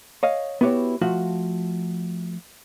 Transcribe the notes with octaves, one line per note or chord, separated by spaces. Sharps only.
C#5 D#5 F5
B3 E4 F#4 G4 C#5
F3 A3 F4 F#4